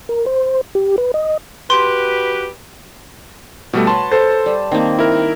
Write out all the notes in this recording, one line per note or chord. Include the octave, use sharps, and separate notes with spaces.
A#4
C5
G4
B4
D#5
F#4 G4 B4 C6
B2 G3 A3 F#4
B4 C#5 A5 C6
A4 C5
G3
D#3 A#3 C4
E4 A#4